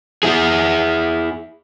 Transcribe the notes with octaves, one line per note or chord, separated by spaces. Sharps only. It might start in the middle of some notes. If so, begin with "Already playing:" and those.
E4 G#4